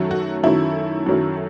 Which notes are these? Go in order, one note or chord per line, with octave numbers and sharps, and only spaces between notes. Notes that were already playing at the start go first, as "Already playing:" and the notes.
Already playing: F#2 D#3 F#3 A3
F#4
F#2 D#3 F#3 A3 E4
F#2 D#3 F#3 A3